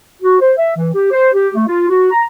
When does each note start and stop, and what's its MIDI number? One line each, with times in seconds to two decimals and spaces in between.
0.22 0.38 66
0.40 0.53 72
0.57 0.73 76
0.76 0.88 52
0.95 1.07 67
1.11 1.28 72
1.33 1.48 67
1.55 1.65 57
1.67 1.85 65
1.89 2.10 66
2.11 2.24 82